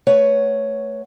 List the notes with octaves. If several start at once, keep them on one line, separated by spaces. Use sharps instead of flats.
A3 B4 C#5 F#5